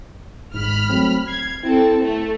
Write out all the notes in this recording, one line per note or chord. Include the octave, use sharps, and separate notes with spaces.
G#1 G#2 B5 F6
F#3 A3 C4
G#6 C7
C4 E4 A4
A3